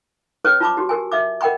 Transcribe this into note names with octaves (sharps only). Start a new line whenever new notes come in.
C#4 G#4 B4 C#5 C#6
F4 A5 B5 C#6 D6
F#4 G4
G4 A#4 G#5
D#5 E5 D6
A#4 D#5 F#5 G5 B5 C#6